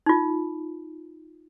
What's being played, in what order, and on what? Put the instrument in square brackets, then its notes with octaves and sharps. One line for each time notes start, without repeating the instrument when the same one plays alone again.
[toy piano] D#4 F4